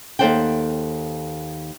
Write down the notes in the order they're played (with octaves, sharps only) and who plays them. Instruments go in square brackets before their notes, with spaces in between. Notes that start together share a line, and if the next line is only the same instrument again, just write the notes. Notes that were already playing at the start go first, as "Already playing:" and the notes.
[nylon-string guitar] D#2 C#3 A4 C5 F#5 G5